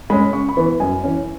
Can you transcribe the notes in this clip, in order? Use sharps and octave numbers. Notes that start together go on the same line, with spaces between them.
G#3 C#4 B5
C#3 C#6
B5
E3 B3
F#2 G#5
E3 C#4